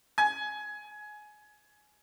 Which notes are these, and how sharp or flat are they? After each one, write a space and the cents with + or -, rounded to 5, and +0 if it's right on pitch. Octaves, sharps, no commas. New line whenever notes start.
G#5 +20